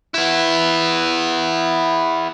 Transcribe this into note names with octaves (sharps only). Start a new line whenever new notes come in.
B3 E4